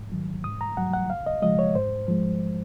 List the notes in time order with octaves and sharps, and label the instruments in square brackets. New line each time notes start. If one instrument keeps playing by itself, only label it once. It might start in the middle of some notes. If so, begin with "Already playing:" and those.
Already playing: [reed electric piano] G#2
D#3 F#3
G#2 D#6
A#5
F#3 F#5
F#5
C#2 F5
D#5
C#3 F3 G#3 D#5
C#5
G#2 C5
F3 G#3